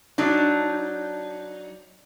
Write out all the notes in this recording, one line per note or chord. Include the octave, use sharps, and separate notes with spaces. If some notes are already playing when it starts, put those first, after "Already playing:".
F#3 D4 D#4